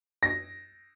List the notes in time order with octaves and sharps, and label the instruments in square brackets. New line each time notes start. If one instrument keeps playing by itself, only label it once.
[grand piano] A#6